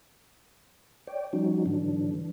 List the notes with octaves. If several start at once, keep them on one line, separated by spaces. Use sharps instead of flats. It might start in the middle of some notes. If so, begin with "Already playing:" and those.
C#5 D5 G5
F3 G3 C#4 D#4 F#4
G#2 D3 E3 F#3 D4
E3